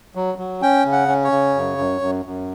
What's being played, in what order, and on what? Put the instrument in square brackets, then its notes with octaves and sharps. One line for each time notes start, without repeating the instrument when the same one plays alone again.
[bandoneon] F#3
F#3
C#4 G5
C#3
F#5
C#4
C#5
C#3
F#2
F#2
F#2
F#2